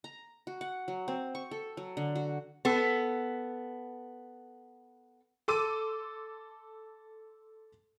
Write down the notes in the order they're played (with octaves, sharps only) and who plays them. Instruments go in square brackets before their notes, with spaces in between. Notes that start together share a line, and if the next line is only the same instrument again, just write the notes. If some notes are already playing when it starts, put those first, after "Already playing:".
[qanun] A#5
F#4
F#5
F#3
C4
C#6
A4
F#3
D3
F#4
[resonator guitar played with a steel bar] B3 A4
[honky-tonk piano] A4 C6 D6 E6 D#7